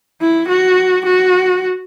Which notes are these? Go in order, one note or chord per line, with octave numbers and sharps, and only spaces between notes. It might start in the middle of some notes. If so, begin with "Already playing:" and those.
E4
F#4
F#4